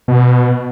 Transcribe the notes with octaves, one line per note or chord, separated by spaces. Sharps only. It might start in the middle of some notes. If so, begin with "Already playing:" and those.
B2